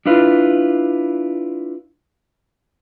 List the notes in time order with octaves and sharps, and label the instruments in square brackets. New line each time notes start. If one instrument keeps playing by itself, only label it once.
[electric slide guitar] D4 E4 F4 B4